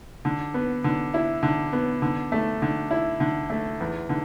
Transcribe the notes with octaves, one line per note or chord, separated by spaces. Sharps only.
D3
B3
D3
E4
D3
B3
D3
A3
D3
E4
D3
A3
E2
D3